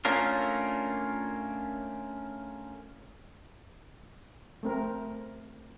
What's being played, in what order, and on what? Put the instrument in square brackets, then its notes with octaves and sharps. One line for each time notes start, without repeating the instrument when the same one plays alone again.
[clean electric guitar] A3 A#3 C#4 D4 F4 A#4
[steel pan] A3 C4 A#4